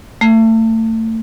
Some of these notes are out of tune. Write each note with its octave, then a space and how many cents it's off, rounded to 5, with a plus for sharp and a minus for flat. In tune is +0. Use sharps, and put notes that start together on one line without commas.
A3 +30